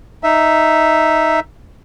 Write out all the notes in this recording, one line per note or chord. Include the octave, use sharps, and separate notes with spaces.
D#4 E5